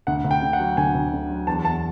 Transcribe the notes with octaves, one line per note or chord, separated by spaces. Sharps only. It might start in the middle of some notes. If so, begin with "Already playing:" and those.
D2 F#5
D2
G5
D3
F#5
F#3
D2 G#5
D2
D3
F#3
E2 A5
E2 A5